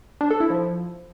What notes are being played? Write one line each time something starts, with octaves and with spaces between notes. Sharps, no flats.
D4
A4
E4
F3